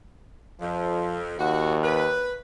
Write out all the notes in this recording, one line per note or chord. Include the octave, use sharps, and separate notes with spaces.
F2 F3
D#2 F#4
B4